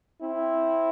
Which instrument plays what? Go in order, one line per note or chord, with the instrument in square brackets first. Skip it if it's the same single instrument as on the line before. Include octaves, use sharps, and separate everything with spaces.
[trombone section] C4 E4